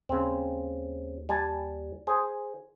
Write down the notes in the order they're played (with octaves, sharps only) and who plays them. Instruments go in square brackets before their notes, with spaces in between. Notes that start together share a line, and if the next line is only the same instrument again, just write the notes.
[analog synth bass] D#2 [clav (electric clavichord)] C#3 C4
[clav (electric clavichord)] G3 G#5 A5
G#4 C5